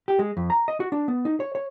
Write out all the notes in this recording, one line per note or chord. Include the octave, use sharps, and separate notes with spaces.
G4
G#3
F2
A#5
D#5
F#4
D4
B3
D#4
C#5
C#5